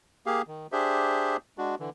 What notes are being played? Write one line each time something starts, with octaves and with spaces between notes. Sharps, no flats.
A#3 G4 G#4 F5
D#3
D4 G4 G#4 C5 E5
G#3 D4 F#4
D3 E3